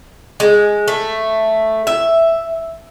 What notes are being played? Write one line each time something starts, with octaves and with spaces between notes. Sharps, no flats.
G#3
A3
E5